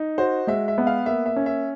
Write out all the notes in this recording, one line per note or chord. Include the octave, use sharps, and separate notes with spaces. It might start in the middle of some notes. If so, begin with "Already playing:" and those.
Already playing: D#4
F#4 C5
G#3 E5
E5
B3
F5
A#3 E5
E5
C#4
E5